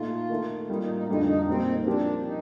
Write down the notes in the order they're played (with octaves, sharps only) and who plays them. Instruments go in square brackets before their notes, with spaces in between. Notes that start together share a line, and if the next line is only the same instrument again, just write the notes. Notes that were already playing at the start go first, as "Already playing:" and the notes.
Already playing: [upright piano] A#2 A3 D#4 [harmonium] F4
[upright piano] D#3 A3 D#4
[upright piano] A2 G3 A#3 F4 [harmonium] D#4
[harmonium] D#4
D#4
[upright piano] F2 D3 G3 D4 F4 [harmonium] D#4
[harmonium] D#4
[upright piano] A#2 G3 A#3 D#4 G4 [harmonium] C4
[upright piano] F3 C4 G4 A#4 [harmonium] D4
[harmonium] D#4